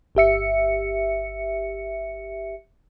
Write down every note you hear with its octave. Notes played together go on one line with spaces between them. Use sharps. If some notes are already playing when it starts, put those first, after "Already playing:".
G1 G4 E5 C#7